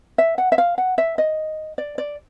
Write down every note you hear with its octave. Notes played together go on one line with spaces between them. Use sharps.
E5
F#5
E5
F5
F#5
E5
D#5
D5
D5